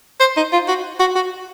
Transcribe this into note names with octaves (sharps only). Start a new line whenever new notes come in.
C5
D#4
F4
F#4
F#4
F#4